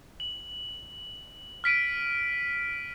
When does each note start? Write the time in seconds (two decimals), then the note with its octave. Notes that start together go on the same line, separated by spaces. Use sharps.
0.20 F#7
1.64 F6 B6 D7 D#7